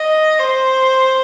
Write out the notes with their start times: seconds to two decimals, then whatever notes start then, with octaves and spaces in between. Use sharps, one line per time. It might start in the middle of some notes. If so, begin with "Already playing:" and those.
Already playing: D#5
0.39 C5